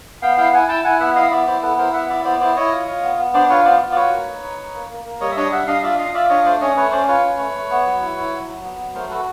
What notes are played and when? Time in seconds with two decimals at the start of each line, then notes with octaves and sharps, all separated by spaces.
0.22 B3 F5 G5
0.37 E4 F5 G5
0.53 E4 F#5 G#5
0.68 E4 G5 A5
0.84 E4 F#5 G#5
1.00 B3 E5 F#5
1.15 E4 D#5 F5
1.31 B3 D5 E5
1.47 E4 C5 D5
1.62 B3 A4 B4
1.78 E4 A#4 C5
1.93 B3 E5 F#5
2.09 E4 D5 E5
2.24 B3 C5 D5
2.40 E4 C5 D5
2.56 E4 C#5 D#5
2.72 F4
2.87 F4
3.03 B3
3.18 B3
3.34 D4 C5 D5
3.49 F4 B4 C#5
3.65 B3 C5 D5
3.80 F4
3.92 D5
3.96 F#4 B4 C#5
4.12 A#3
4.28 D#4
4.43 D#4
4.59 D#4
4.74 A#3
4.90 A#3
5.05 A#3
5.21 G3 C#5 D#5
5.31 E5
5.36 D4 C#5 D#5
5.52 G3 E5 F#5
5.67 D4 D#5 F5
5.83 F4 D5 E5
5.98 F4 D#5 F5
6.14 F4 D5 E5
6.29 D4 C#5 D#5
6.45 A3 C5 D5
6.61 C#4 C#5 D#5
6.77 A3 B4 C#5
6.92 C#4 C5 D5
7.08 F4 B4 C#5
7.23 C#4
7.39 A3
7.55 A3
7.70 B3
7.86 F#3
8.01 E4
8.17 E4
8.32 F#3
8.48 F#3
8.64 B3
8.79 F#3
8.95 A3 A#4 C5
9.10 F#4 A4 B4